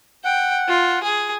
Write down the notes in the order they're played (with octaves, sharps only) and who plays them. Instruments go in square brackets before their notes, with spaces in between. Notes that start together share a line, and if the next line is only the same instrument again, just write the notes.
[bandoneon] F#5 [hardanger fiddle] G5
[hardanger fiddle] F4
G#4